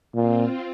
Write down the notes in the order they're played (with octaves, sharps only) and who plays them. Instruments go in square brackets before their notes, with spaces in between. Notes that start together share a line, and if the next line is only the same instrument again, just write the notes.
[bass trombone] A#2 [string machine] C4 F4